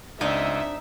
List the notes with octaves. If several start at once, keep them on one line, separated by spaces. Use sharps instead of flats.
C#2 C4 D4 D#4 D#5 E5